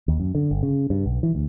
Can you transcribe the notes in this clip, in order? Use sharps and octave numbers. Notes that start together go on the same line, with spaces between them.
D#2
F#2
D3
G1
C#3
G2
B1
E3
D2